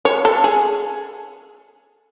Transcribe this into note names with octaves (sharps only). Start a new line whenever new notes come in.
C#5
A4
G#4